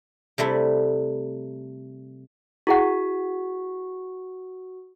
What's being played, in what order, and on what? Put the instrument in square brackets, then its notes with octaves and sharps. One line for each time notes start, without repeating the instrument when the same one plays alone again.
[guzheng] C3 G3 A3 E4
[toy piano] E4 G#4 F#5 [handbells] F#4